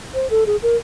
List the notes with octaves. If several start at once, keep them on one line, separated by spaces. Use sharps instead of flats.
C5
A4
G#4
A#4